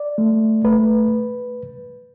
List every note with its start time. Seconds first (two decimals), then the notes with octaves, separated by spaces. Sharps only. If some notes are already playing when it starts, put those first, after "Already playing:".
Already playing: D5
0.18 A3
0.64 A3 B4